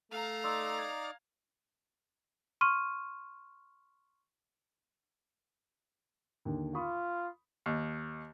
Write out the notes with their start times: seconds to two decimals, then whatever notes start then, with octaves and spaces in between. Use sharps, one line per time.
0.12 A3 F5 A#5
0.44 D#4 D5 C6 E6
0.78 G#6
2.61 C6 C#6 F6 D#7
6.45 D#2 D3
6.75 F4 B5 C#6 D#6
7.66 D#2